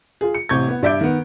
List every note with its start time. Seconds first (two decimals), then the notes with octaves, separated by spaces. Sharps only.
0.21 F4 G#4
0.34 C#7
0.49 A1 C3 C#6 G6 G#6
0.68 B3
0.82 G2 D5 E5 D6 G6 D7
1.01 D#3 B3